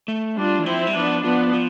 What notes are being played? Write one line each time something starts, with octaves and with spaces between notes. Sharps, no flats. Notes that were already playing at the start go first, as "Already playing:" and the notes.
A3
G3 D4 F4
E3
F3 C4 E4
G3
F3 B3 D4
F3 B3 D4
F3